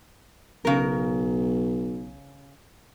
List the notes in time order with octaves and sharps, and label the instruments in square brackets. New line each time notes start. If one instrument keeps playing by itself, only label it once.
[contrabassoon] B1 [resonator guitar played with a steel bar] C#3 A#4